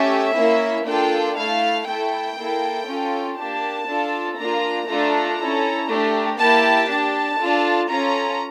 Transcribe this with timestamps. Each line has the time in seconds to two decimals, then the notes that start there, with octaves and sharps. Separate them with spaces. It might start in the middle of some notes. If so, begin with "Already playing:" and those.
Already playing: A3 C#4 G4 E5
0.36 A#3 C#4 E4
0.85 A#3 D4 F4 A4 G5
1.36 A3 E4 A4 F5
1.86 A3 E4 A4 G5
2.37 A#3 E4 A4
2.87 C#4 F4 A4
3.37 A#3 D4 G4 A5
3.87 D4 F4 A4
4.37 A#3 D4 F4 A#5
4.88 A3 D4 F4 A4 A#5
5.38 C#4 E4 A4
5.88 A3 D4 G4
6.38 A#3 E4 G4 A5
6.89 D4 G4 A5
7.39 D4 F4 A4
7.89 C#4 F4 A4 A#5